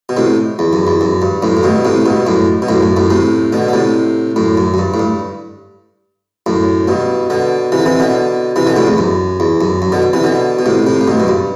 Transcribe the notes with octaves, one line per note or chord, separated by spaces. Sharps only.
B2
A2 C3
E2
F#2
E2
F#2
G2
F#2 A2
A2
G2 B2
A2 C3
G2 B2
F#2 A2
B2
F#2 A2
F#2
F#2 A2
A2 C3
B2 D3
D3
A2 C3
F#2 A2
F#2
F#2
G2
A2
G2
F#2 A2
G2 B2
B2 D3
C3 E3
D3
C3 E3
B2 D3
C3 E3
B2 D3
A2 C3
E2
F#2
E2
F#2
F#2
B2 D3
C3 E3
B2 D3
B2
A2 C3
A2 C3
A2
G2 B2
F#2
G2